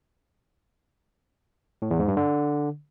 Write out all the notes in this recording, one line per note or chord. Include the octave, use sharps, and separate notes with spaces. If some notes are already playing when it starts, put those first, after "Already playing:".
A2
E2
G#2
G2
D3